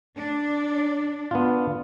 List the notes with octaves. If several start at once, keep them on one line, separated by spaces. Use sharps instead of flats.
D4
B3 D4 F4